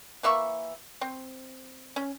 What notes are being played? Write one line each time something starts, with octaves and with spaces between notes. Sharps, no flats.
E3 A#3 E5 C#6
C4
C#4